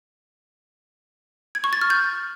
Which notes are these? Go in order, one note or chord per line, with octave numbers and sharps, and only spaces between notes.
G#6
C#6
A6
F6
G6